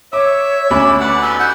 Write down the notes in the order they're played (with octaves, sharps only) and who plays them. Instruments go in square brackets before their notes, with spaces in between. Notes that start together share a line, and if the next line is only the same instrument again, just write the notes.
[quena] C#5 [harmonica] E5 [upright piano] D6
[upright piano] D2 C#4 B5 [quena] D6
[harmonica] B4 D5 F#5
[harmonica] G3 B3 D#4 [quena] E6
[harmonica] F#4 F#5 [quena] G6